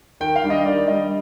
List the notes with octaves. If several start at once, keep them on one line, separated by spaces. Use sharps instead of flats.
D#3 G5
F5
G3 D4
D#5
D#3 D5
G3 D4 D#5